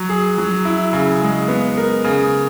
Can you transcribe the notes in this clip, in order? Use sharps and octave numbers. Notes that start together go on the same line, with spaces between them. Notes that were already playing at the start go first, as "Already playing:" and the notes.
Already playing: F#3
G#4
F#3
E4
C#3
G#3
B3
A#4
C#3